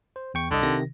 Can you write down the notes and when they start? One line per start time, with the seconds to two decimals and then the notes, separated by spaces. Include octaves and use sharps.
0.16 C5
0.34 E2 G5 C#6
0.51 C2 D3 D#5
0.63 C3 D#3 A#6